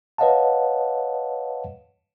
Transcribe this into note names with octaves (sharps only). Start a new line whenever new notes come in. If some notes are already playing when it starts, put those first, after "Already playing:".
B4 C#5 D#5 F5 F#5 A5